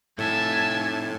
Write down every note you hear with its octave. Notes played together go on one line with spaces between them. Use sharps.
F2 A2 A3 E5 G#5 A5